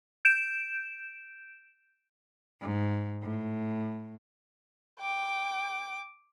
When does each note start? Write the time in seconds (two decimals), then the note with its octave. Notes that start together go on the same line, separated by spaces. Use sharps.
0.25 G6 D7 E7
2.60 G#2
3.22 A2
5.00 G5 D6